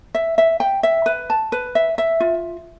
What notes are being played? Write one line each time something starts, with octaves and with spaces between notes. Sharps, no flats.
E5
E5
G5
E5
B4
A5
B4
E5
E5
F4